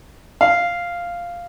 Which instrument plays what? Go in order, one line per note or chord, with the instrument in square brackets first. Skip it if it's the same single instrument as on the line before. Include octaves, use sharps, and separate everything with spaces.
[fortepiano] F5